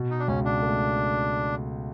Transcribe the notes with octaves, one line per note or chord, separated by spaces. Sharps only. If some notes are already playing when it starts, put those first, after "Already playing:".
Already playing: B2
D#4
D4
C#2 C#4
D4
A3